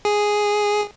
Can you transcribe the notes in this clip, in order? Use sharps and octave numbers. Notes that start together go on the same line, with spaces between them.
G#4